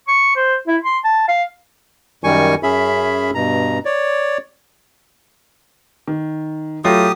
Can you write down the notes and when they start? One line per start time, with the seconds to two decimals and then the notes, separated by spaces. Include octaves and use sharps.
0.08 C#6
0.36 C5
0.67 E4
0.83 C6
1.04 A5
1.28 F5
2.24 F#2 D#3 G3 G#5 C#6
2.63 F#2 C#4 G#4 E5 B5
3.35 G2 B2 A#5
3.85 C#5 D5
6.08 D#3
6.84 F#3 A3 F4 G4 D#6